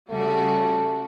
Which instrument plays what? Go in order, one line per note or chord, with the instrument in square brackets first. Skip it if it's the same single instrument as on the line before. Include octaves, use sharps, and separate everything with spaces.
[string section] C#3 G3 F#4 [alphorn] A3